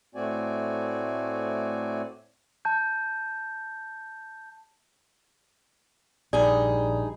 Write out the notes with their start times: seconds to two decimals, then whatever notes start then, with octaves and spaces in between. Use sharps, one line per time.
0.15 A2 A3 C4 F#4 D5 G#5
2.65 A5 G6
6.33 A#1 G2 D#4 G#4 D5